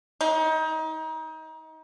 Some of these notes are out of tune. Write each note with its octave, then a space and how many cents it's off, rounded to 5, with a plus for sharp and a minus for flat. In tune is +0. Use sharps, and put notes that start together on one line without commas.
D#4 +30